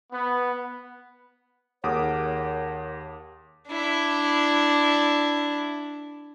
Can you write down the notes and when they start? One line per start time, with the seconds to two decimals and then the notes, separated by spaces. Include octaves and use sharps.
0.11 B3
1.84 D#2 G#4 A#4 C#5 F#5 D6 D#6
3.68 D4 E4